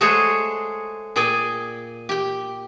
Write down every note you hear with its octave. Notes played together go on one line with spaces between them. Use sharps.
G#3 A3 F#4 G#4 C5 C#5
A#2 G#4 D5 G5 G#5
G4 G5